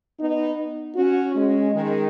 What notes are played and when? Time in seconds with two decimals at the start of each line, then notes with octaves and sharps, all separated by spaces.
0.20 B3 D#4
0.96 C#4 F#4
1.35 G#3 C#4
1.72 D#3 G#3